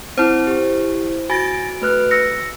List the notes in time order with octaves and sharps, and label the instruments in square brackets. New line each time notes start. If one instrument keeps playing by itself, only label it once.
[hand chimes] C4 [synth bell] E4 C5
[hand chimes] G4
[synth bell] F#4 D7 [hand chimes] G#5 A6 A#6
[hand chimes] A3 B4 F#6
E6 A#6 C#7